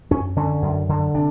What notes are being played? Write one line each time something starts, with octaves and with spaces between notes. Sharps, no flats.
F#2 C#4
D3 C#4
F#2
D3
C3 D4